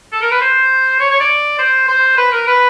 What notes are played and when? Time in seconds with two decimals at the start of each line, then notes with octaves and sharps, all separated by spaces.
0.12 A4
0.22 A#4
0.31 B4
0.41 C5
0.99 C#5
1.10 C#5
1.20 D5
1.59 C5
1.88 C5
2.17 B4
2.32 A#4
2.47 B4